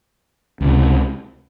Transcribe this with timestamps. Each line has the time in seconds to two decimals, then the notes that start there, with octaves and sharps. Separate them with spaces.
0.60 C#2 C3